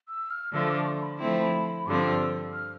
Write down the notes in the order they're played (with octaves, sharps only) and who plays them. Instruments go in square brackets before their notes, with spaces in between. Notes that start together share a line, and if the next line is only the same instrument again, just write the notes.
[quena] E6
F6
[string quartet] D3 F3 A3 [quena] E6
[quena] D6
C6
B5
[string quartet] F3 A3 C4 E4
[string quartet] G2 D3 F3 C4 [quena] D6
[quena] F6
E6
F6